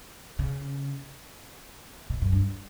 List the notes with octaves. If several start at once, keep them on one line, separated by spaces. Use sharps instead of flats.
C#3
B2
F#2
G2